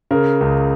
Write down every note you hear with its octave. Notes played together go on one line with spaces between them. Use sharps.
C#3 A#4
C#2